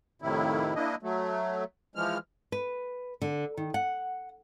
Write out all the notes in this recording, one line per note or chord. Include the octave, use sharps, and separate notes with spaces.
F2 A2 C3 D#3 E4
A#3 D4 E4 D#5
F#3 A3
E3 F3 G#3 F6
B4
D3
D#3
F#5